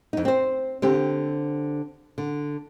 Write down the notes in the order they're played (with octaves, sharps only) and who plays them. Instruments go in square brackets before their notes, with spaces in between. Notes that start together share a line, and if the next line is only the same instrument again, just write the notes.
[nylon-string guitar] F2 D#4
C4 C5
D3 C4 G4
D3